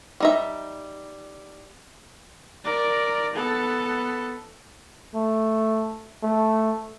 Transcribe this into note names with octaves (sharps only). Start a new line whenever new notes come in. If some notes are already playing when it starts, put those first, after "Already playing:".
G3 D#4 E5
A#4 D5
B3 A4
A3
A3